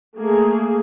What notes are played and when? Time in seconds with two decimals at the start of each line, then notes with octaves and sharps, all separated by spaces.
0.17 A3 A#3 G#4